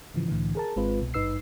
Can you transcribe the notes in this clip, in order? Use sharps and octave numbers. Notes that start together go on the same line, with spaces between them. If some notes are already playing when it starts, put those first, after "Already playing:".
G#2 C#3 E3 F3
C2 A2 D3 E3
G#4 A#4 A5
G#1 G#3 C4 F4 B4
C2 B2
G#1 G2 D#4 B4 E6 C7